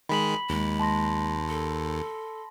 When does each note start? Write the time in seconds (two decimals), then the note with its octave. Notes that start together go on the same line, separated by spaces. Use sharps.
0.09 D#3 G#3 B5 B6 F#7
0.50 D#2 G#3
0.80 A5 C6 A#6
1.49 A4